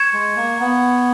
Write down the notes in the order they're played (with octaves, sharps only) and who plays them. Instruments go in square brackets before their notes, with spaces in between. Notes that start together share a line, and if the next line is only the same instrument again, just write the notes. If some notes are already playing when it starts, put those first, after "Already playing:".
Already playing: [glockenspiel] C#6 G#6 C#7 E7
[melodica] G#3
A#3
B3